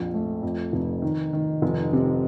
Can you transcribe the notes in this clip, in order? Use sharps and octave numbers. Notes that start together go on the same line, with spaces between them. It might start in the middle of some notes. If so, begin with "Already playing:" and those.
Already playing: A#1 F2
A3
F2
F1
D#3
D#3
F1
C3